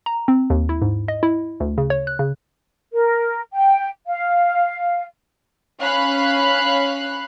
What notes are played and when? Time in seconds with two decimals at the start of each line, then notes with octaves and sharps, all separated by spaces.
0.06 A#5
0.28 C4
0.50 D#2
0.69 E4
0.82 G#2
1.08 D#5
1.23 E4
1.60 D2
1.78 C#3
1.90 C#5
2.07 F#6
2.19 C#3
2.93 A#4
3.54 G5
4.07 F5
5.81 C#4 F5 B5 F#6